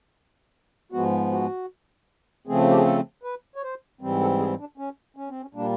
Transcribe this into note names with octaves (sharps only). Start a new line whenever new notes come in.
G#2 F3 G#3 B3 F#4
F#4
C#3 F3 A3 C4 G#4
G4
G#4
A4
B4
C#5
C5
G#2 E3 G3 C4
A4
G#4
D4
C#4
C#4
C4
C#4
A#2 G3 A#3 D4